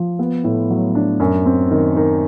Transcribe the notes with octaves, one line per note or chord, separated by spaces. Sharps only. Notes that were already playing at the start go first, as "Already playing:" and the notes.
Already playing: F3
B3
A2
F#3
D4
F#2
C4
D#3
D#3